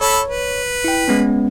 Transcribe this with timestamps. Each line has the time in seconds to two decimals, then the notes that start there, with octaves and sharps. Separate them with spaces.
0.01 A4 C#5 B5
0.28 B4
0.84 E4 G5
1.08 G#3 B3 C#4